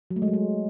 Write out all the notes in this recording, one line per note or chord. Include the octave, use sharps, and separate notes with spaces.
F#3
A3
G#3
F#3
G#3